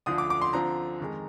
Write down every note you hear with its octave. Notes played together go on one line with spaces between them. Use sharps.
D2 D3 F3 D#6
D6
D6
C6
D3 F3 C4 A#5
F2 D#3 G#3